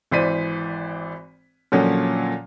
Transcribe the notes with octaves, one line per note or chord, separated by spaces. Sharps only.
G#1 E3 C5 D5 B6 D#7
A#2 D3 F3 F#3 C#4